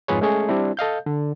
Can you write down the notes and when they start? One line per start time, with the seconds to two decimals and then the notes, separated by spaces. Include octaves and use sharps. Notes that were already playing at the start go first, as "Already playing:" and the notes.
0.08 F2 G#2 F4 G#4 B4 C#5
0.21 G#3 A3 C#4 G#4 C#6
0.49 G3 C4 D4 E4
0.77 A4 D#5 F5 G6
1.06 D3